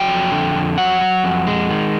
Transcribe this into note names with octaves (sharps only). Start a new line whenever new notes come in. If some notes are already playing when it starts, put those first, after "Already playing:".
Already playing: F#3 G5
F2
D3
F2
F#3 F#5
F#3
F2
G#3
D#3